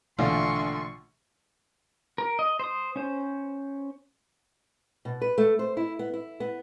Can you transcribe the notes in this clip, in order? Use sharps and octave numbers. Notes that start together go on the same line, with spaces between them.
A#1 B2 D3 E3 A3 F4 C6 C#6
A#4
D#5
C5 D#6
C#4 C5
B2
B4
A3
C5
E4
B3
E4
B3